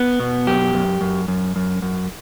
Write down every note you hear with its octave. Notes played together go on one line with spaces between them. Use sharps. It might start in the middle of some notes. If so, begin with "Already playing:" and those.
Already playing: B3
B2
F#2 G4
F#2
F#2
F#2
F#2
F#2